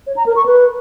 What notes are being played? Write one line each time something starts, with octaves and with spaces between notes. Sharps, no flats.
C#5
A#5
A#4
C#6
B4